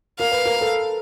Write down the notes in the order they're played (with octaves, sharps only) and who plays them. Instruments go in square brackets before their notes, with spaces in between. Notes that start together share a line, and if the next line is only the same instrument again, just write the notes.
[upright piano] A#4 [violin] F5
[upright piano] B4
A#4
A4